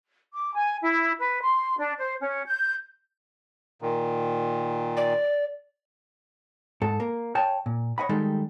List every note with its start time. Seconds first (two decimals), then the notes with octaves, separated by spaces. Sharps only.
0.33 D6
0.55 G#5
0.83 E4
1.19 B4
1.41 C6
1.78 D4
1.99 C5
2.21 C#4
2.46 G6
3.82 A#2 D#3
4.97 D5
6.82 G#2 A4
7.00 A#3
7.35 C#5 G5 A5
7.66 A#2
7.98 C#5 D#5 F#5 B5
8.09 D#3 G3 G#3 D#4 A4